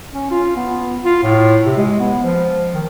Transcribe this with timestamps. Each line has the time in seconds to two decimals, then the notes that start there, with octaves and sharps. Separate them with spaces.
0.13 C#4
0.31 F4
0.56 B3
1.05 F4
1.23 A2
1.66 C3
1.77 G#3
2.00 B3
2.23 F3
2.74 D#3